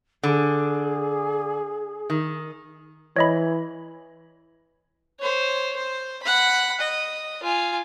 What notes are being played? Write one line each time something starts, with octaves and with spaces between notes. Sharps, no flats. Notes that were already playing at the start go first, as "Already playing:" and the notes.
D3 G#4
D#3
E3 C#5 D#5 B5
C5 C#5
C5
F#5 B5
D#5
F4 G#5